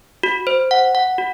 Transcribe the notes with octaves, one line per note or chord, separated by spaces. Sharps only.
F#4
C5
F#5
F#5
F#4